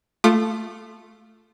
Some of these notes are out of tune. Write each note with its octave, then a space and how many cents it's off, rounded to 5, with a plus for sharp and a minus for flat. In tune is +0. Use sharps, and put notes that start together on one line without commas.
A3 +0 F4 +0 D#6 -45